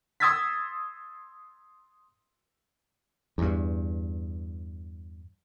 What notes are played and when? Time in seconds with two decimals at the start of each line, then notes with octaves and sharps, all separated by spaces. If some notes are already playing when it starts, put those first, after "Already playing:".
0.20 C6 D#6 E6 G#6 A6 B6
3.38 E2 G2